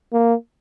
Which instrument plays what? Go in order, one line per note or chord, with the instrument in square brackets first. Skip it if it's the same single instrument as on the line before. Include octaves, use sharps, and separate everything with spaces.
[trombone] A#3